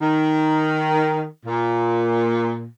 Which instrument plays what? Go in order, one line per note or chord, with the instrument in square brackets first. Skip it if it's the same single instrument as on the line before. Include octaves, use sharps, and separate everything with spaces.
[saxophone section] D#3
A#2